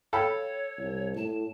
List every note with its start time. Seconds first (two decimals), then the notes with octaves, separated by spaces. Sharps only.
0.13 A4 C#5 F5 G5 B5
0.78 C2
1.16 A2 A5